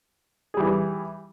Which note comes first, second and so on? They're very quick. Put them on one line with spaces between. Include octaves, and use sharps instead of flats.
G#4 G3 E3